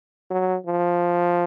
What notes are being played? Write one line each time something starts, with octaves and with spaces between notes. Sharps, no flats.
F#3
F3